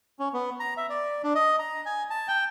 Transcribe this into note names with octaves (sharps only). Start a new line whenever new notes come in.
C#4
B3
A#5
E5
D5
D4
D#5
A#5
G#5
A5
G5